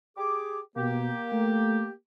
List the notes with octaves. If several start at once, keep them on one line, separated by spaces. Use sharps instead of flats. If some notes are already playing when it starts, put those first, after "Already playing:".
G4 G#4 D6
B2 A#3 G4
A3